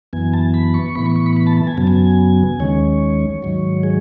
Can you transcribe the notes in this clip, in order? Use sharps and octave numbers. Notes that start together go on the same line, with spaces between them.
F#2 E3 B3 G#5
A5
B5
C#6
A2 E3 B3 B5
C#6
C#6
B5
B5
A5
A5
G#5
F#2 C#3 F#3 B3 A5
G#5
D#2 D#3 G#3 C#4 C#5
G#2 D#3 F#3
G#4